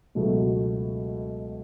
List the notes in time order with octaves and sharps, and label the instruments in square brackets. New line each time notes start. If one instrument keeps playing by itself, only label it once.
[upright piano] C#2 B2 F#3 A3